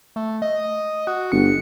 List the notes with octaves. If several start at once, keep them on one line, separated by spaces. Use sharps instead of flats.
A3
D#5
F#4
G1 C#7